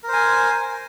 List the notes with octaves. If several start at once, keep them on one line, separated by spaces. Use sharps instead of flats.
A#4 C5 G#5